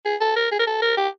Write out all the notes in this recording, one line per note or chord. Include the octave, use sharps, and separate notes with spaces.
G#4
A4
A#4
G#4
A#4
A4
A#4
G4